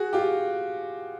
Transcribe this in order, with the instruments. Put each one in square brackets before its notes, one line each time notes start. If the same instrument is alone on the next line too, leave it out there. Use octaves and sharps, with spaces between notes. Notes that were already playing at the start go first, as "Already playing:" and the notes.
Already playing: [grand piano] F#4 G#4
F4 G4